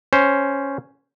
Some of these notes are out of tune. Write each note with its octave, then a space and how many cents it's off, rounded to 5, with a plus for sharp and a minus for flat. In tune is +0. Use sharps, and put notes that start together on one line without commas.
C#4 +0 C5 +0